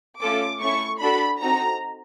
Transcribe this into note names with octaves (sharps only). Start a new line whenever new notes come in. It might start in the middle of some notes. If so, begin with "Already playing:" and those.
A3 C#4 F4 A4 D6
A3 C#4 E4 C#6
D4 F#4 A4 B5
C4 D#4 F#4 A4 A#5